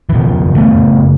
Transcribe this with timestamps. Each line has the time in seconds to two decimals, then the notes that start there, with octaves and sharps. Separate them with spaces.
0.09 E3
0.14 B2 D#3 F3
0.42 F#1
0.56 A3 B3
0.71 F#1